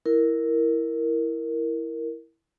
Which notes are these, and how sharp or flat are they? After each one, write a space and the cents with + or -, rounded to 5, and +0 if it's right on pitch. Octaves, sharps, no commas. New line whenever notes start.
E4 +0 A#4 +0